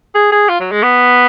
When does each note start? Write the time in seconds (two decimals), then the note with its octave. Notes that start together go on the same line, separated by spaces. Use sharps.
0.15 G#4
0.32 G#4
0.49 F4
0.60 F#3
0.72 G#3
0.83 B3